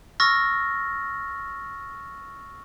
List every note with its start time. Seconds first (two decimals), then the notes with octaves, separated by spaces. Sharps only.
0.20 C#6 E6 F6 A6 A#6